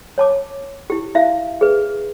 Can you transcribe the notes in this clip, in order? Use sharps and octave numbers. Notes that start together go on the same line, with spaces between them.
C#5 A5 D6
E4 G4
E4 E5 F5
G#4 B4